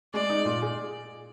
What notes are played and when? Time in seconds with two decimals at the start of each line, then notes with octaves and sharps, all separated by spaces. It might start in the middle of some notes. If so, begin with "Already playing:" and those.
0.14 G#3 D5
0.29 D#4
0.45 A#2
0.62 G#4